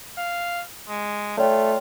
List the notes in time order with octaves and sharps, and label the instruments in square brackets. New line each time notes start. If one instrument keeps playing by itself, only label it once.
[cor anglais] F5
G#3
[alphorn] A3 [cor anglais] F4 [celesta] C#5 D5 G5